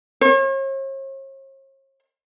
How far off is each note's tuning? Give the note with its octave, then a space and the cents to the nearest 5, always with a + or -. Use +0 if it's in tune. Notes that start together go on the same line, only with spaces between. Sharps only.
C#5 -45